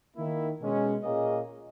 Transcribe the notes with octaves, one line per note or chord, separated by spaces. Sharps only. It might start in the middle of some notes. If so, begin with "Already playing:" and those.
D#3 A#3 E4
B2 G#3 C#4
A#2 A#3 C#4 G#4 D#5